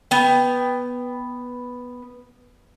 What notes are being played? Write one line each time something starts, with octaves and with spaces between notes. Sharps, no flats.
B3 G5